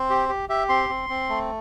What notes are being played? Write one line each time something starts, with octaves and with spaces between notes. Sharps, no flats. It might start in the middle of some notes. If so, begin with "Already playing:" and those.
Already playing: C4 C5
G4
G4
G4 E5
C4 C6
C4
C4
A3